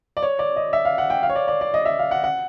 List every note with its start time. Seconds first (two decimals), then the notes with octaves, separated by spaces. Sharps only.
0.17 D5
0.23 C#5
0.39 D5
0.56 D#5
0.73 E5
0.85 F5
0.98 F#5
1.10 G5
1.23 F5
1.29 C#5
1.36 D5
1.48 D5
1.61 D5
1.74 D#5
1.85 E5
1.99 F5
2.11 F#5
2.24 F#5